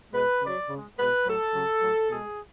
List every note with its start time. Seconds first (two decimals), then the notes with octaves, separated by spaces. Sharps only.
0.13 B2 G#3 B4
0.41 C#3 F#3 D5
0.69 C#3 G#3
0.97 B2 G#3 B4
1.25 A2 F#3 A4
1.54 C#3 F#3
1.81 A2 F#3
2.09 B2 G#3 G#4